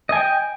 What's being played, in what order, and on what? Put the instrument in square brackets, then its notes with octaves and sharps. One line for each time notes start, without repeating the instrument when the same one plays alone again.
[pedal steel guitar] D#5
G#5
G5